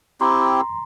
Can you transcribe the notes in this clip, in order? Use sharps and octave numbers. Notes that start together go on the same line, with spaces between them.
C4 E4 G4 A#5 C6